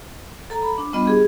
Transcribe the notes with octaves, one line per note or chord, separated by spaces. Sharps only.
A4 A#5
B5
D4
G3 B3 D4 F4 D#5 B5
G4 G#4